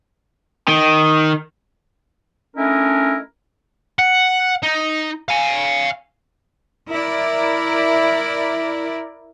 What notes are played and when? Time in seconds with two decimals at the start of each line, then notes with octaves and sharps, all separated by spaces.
0.68 D#3
2.56 A3 C#4 D4 E4 A#4 D#5
3.99 F#5
4.63 D#4
5.29 F5 G#5
6.89 E4 A#4 D5